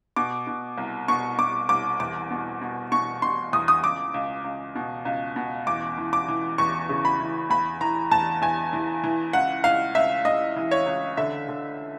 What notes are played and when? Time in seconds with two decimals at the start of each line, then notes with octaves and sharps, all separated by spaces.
0.16 B2 D6
0.47 B2
0.78 C2
1.08 B2 C#6
1.38 B2 D6
1.69 C2 D6
2.00 E2 D6
2.31 B2
2.61 B2
2.92 B2 C#6
3.22 B2 C6
3.53 E2 D#6
3.68 D#6
3.83 C#2 D6
4.14 C#2
4.44 C#2
4.75 B2
5.05 C#2
5.36 B2
5.67 E2 D6
5.98 E3
6.13 D6
6.28 E3
6.58 E2 C#6
6.89 C#3
7.05 B5
7.20 E3
7.50 E2 B5
7.81 E3 A#5
8.11 E2 A5
8.42 E2 G#5
8.73 E3
9.04 E3
9.33 C#2 F#5
9.64 C#2 F5
9.95 C#2 E5
10.25 C#2 D#5
10.56 E3
10.71 C#5
10.86 C#2
11.17 D3 E5
11.49 D3